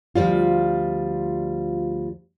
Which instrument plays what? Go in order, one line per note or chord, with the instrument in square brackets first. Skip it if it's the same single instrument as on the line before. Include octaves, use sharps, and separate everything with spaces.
[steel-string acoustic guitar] D2 F3 G3 F4